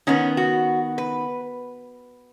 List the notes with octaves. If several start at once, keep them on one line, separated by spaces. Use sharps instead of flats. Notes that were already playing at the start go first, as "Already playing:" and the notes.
D#3 B3 C#4
F#4
B4